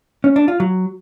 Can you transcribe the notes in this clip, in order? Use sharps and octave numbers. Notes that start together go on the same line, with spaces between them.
C#4
D4
F4
F#3